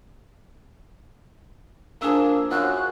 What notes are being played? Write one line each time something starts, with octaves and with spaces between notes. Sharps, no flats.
F3 A#3 D4 G#4 E6
F#2 F4 F#4 C5 F#6